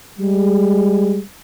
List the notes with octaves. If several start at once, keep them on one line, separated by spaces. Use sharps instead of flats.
G3 G#3